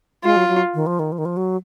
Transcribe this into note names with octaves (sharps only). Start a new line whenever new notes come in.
G#3 F4
F#3
F#3
D#3
F3
D#3
F3
D#3
F3
F#3